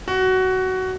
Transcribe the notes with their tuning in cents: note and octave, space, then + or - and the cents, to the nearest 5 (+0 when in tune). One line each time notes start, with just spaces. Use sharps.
F#4 +15